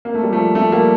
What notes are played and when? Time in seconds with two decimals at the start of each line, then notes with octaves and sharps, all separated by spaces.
0.05 A#3
0.15 A3
0.23 G3
0.33 F3 A3
0.55 F3 A3
0.72 G3 A#3